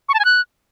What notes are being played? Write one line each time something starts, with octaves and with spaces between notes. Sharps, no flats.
C#6
A5
G#5
F#6